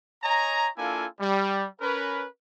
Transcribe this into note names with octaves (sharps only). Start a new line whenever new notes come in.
C#5 D#5 G#5 A#5
A#3 D4 E4 F4 A4 G#5
G3
C#4 A#4 B4